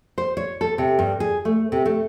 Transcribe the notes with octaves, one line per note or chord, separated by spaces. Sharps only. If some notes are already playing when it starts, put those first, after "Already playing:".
C5
C#5
A4
C3
G2
G#4
A3
C3
A3